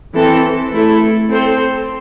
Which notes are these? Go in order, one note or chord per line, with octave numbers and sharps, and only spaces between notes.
E3 C4 A4
A3 E4 A4
C4 A4 C5